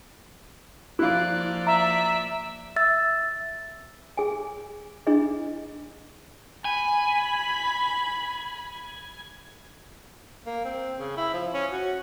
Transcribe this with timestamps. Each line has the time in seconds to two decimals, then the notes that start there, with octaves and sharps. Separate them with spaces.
0.99 F3 A#3 E4 F4 D5 F#6
1.67 E5 A#5
2.76 E5 E6 A6
4.17 G#4 G#5
5.07 D4 E4 G#4 D#5
6.65 G#5 B5
10.46 A#3
10.65 C4
10.99 C#3
11.17 E4
11.34 F3
11.54 C#4
11.71 F#4